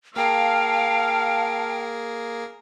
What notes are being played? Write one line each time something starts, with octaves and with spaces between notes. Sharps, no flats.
A#3 G#4 A#4 F5 G5 A5